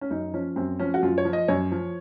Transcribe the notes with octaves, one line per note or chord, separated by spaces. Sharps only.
C#4
F#2 D#4
F3 C#4
F#2 C4
F3 C#4
F#4
F#2 F4
C#5
F3
D#5
F#2 C#5
F3